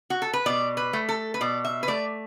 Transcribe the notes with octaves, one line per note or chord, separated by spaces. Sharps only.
F#4
A4
B4
B2 D5
B4
A3
A4
B4
B2 D5
E5
B4
A3 D5